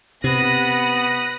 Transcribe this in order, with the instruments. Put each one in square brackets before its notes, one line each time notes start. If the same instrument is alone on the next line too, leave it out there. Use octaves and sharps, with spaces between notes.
[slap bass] C3 [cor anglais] B3 [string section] B5 F#6 A#6 [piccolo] D#7